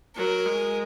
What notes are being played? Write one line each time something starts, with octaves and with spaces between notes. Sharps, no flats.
F#3 A#4
G#3